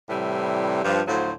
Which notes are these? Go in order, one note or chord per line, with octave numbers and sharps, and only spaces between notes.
A2 C3 E3 G3
G2 F3
D2 A2 F3 F#3 C5